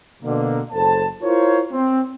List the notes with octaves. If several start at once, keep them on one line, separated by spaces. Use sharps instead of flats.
B2 D3 A#3
F#1 A4 C5 A5
E4 F4 A#4 C5 C#5
C4